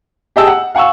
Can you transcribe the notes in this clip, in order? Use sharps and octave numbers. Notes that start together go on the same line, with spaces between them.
G4 G#4 D#5 G5 A5 E6
F#5
F5 F#5 G#5 C#6 E6